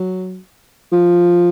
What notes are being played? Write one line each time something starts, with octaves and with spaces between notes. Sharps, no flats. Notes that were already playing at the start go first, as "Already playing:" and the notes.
Already playing: F#3
F3